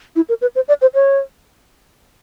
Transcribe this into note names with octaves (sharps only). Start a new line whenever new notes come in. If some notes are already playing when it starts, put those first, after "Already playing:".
E4
A#4
B4
C5
D5
C5
C#5